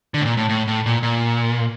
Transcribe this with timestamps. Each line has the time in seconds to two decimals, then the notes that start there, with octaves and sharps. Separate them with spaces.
0.14 D3
0.21 A2
0.25 A#2
0.37 A2
0.49 A2
0.68 A2
0.86 A#2
1.03 A#2